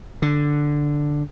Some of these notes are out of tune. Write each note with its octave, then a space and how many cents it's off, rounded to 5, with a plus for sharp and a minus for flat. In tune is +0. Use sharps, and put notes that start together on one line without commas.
D3 +0